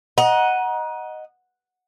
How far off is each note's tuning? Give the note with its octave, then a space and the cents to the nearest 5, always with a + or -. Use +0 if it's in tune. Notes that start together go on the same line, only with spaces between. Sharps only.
D#5 +0 F#5 +0 A#5 +30